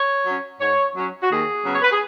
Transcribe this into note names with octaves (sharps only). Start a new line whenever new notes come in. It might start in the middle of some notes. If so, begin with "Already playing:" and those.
Already playing: C#5
F#3 C#4
G#2 C#5
F#3 C#4
F#4
D#2 G#4
C#3 F#3 B3
C#5
B4
G#4